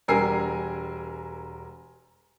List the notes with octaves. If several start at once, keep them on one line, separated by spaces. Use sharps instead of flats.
E1 G3 A#4 G#5 E6 C7